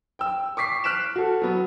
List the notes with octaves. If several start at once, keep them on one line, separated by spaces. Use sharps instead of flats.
G5 E6
C#6 D6 B6 C7
F6 F#6 B6 D7 E7
F#4 A4
F#3 B3